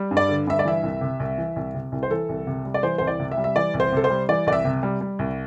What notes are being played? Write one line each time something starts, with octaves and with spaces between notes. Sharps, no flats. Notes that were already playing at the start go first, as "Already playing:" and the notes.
Already playing: G3
G2
D5
D3
G2 E5
D5
E3 E5
C2
C3
C2
E3
C2
C3
C2
C5
E3 A4
C2
C3
G3
D5
E3 C5
C2 C5
D5
C3
E5
G3
E5
E3 D5
C2
C5
C3 A4
C5
G3
E3 D5
C2 D5
E5
C3
G3
G3
C2